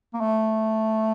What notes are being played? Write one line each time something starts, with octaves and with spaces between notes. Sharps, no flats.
A#3
A3